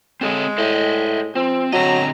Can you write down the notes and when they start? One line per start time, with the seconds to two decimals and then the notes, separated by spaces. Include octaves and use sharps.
0.21 G#3 C4 A4 C#5
0.58 A2 C5 D#5 E5
1.35 F3 C4
1.73 D3 F#3 C4 D#5 A#5